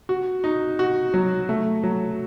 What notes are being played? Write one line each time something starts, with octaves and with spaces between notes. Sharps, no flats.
F#4
D#4
F#4
F#3
A3
F#3